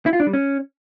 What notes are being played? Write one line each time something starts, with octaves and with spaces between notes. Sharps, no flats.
E4
F4
D4
G3
C#4